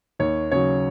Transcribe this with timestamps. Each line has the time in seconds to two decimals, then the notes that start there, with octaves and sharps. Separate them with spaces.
0.19 D#2 C#5
0.52 C#3 F#3 C#5